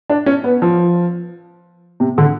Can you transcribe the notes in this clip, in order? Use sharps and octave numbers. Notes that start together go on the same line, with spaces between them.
D4
C#4
B3
F3
C3
D3